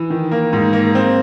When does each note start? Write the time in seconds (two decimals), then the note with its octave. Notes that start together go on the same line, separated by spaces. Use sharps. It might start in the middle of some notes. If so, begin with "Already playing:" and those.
Already playing: E3
0.10 D#3
0.31 A#3
0.53 G#2
0.73 A#3
0.95 C4